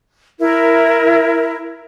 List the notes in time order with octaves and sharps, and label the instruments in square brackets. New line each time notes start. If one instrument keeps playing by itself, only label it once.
[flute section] E4 A#4